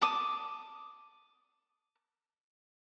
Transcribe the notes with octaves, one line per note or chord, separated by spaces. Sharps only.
A5 D6 D#6